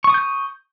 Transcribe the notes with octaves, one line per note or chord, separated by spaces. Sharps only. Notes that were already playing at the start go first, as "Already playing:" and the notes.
C#6 D#6 G6